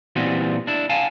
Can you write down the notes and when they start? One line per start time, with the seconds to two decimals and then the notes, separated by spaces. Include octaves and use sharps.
0.16 A#2 E3 G3 B3 C4 F#4
0.67 D4 E4
0.90 F5 G#5 A5